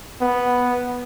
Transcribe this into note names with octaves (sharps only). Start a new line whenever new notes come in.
B3